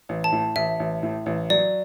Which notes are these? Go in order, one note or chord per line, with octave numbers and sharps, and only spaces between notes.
A1
A5
A2
A1 E5
A1
A2
A1
F#3 D5